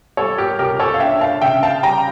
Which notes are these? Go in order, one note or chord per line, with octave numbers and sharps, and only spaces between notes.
G3 A4 C#5
G4 A#4
C#2 G4 A#4
A4 C#5
F5
D4 E5 G5
F5 A5
C#3 E5 G5
F5 A5
G3 G5 A#5